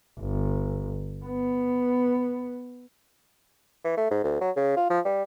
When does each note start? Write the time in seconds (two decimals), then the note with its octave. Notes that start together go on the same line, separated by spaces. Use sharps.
0.20 G1
1.25 B3
3.84 E3
3.97 A3
4.11 G#2
4.24 D2
4.41 F#3
4.56 C#3
4.77 F4
4.90 F3
5.05 G3